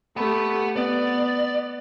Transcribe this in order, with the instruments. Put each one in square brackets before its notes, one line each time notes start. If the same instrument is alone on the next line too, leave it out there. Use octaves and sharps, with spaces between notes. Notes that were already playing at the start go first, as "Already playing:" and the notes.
[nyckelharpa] A3 G4 [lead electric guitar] F#5 B5
[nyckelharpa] B3 [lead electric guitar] D5